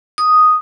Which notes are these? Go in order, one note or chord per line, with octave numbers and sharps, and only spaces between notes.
D#6